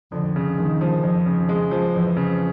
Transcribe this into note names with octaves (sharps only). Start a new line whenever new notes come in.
F2 D3
C#3
D#3 G#3
F3
F2
C#3
G#3
F3
F2 E3
C#3